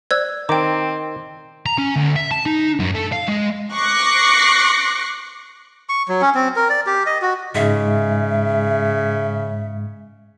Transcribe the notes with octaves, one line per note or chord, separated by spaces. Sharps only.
C5 D5 E6 G#6
D#3 C4 G5 A#5 D6
A#5
C#4
D2
E5
A5
D#4
F#2
A3
F5
G#3
C#6 D6 F#6 A#6 C7 C#7
C#6
F#3
C#4
C4
A#4
D5
G4
D#5
F#4
G#2 C#3 G#3 E5